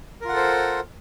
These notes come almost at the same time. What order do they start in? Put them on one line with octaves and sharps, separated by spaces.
A#4 F4 F#5 A4 C5